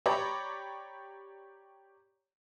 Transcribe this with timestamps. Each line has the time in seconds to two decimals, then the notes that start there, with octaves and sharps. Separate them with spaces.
0.06 G4 C#5 D5 A#5 B5 D6